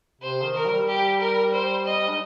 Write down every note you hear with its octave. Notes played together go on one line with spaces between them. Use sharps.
C3 C5
D#3
A#4
G3
G4
A#4
C5
D#5
D#4